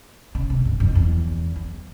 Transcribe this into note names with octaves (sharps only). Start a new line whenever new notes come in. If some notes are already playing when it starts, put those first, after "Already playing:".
C#3
C3
G2
F2
E2
E2